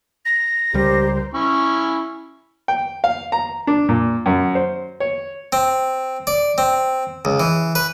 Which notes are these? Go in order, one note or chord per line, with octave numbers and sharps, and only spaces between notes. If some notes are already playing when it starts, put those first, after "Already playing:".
A#6
C#2 G3 G4 A#4 C5
C#4 E4 C#6
G5
F5
A#5
D4
A#2
F#2
C5
C#5
C4
D5
C4
C#2
E3
B4